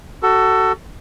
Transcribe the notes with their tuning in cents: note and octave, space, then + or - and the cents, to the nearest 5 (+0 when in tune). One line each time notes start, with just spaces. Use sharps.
F#4 +25 A4 +15